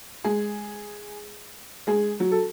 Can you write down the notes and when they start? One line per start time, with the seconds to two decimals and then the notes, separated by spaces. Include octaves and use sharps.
0.24 G#3 G#4
1.87 G#3 G#4
2.20 F#3 F#4
2.31 A4